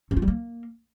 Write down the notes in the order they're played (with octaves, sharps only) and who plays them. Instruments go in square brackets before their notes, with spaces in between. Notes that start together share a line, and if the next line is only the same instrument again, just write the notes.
[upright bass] C#4
F4
G3
A#3